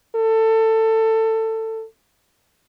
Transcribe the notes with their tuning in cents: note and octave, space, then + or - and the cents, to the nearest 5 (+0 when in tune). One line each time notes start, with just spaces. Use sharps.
A4 +20